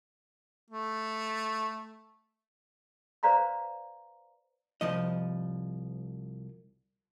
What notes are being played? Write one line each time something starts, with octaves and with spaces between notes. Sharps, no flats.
A3
B4 C5 D5 F5 A#5 C6
C2 F3 D#5